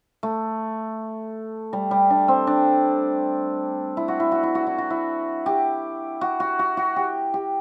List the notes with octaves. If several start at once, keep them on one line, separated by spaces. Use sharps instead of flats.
A3
G3
G3
D4
C4
D4
E4
F#4
E4
F#4
E4
F#4
E4
F#4
E4
G4
F#4
F#4
F#4
F#4
G4
G4